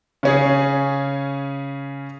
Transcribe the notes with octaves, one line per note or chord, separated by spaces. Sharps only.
C#3 C#4 G#4